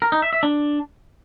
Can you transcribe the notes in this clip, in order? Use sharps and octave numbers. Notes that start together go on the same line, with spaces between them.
A#4
D#4
E5
E5
D4